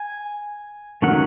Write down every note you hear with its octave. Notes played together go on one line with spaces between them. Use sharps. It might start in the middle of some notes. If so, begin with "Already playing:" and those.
Already playing: G#5
D#3 F#3 A3 C#4 F#5